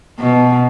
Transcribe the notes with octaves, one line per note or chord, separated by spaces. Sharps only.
B2